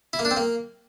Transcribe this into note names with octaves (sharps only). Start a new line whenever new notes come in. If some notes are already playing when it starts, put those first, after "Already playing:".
E4
A#3
D4
C4
A#3